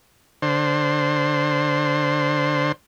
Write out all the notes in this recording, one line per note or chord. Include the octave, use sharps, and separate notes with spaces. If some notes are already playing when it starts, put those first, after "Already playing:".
D3 C5